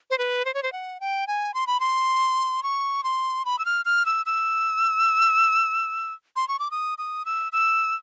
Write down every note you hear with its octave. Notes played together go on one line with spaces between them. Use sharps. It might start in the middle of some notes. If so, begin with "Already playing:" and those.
C5
B4
C5
C#5
C5
F#5
G5
G#5
C6
B5
C6
C#6
C6
B5
E6
F6
F6
E6
E6
C6
C#6
D6
D#6
D#6
E6
E6